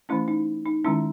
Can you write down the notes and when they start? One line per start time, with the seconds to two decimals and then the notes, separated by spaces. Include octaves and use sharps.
0.09 E3 A3 C#4 E4
0.28 D#4
0.66 D#4
0.84 D#3 G#3 C#4 E4